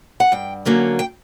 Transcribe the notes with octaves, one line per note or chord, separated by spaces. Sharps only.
F#5
G2 G5
D3 F#3 A#3 C#4
G5